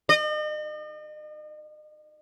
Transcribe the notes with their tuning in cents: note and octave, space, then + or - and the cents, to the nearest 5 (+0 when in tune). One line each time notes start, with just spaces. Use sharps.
D#5 -40